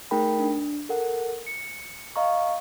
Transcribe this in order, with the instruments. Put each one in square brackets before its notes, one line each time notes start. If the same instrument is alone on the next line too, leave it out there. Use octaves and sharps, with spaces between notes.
[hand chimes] A3 D#4 G#4 A#4 G5 B5
D4
A4 A#4 F#5
C#7
D#5 F5 A#5 C#6